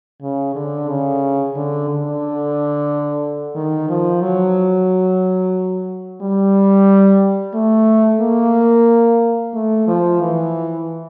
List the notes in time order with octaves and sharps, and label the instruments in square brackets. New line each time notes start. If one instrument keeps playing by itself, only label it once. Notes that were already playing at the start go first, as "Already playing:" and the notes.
[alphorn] C#3
D3
C#3
D3
D3
D#3
F3
F#3
G3
A3
A#3
A3
F3
E3